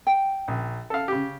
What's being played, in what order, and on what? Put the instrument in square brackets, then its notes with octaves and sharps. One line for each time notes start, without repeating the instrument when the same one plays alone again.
[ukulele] G5
[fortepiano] A#1
A4 F5
C#3 G4